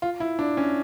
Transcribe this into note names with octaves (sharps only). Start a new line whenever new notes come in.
F4
E4
D4
C#4